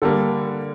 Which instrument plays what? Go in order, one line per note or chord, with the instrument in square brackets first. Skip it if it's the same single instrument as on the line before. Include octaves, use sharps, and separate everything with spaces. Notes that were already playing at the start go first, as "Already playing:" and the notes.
[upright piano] D3 G3 A#3 A4